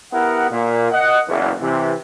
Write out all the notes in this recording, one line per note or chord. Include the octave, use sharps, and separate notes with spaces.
B3 E4 G4 A#4 F#5
A#2
D#5 F#5
F#1 E2
C3 E3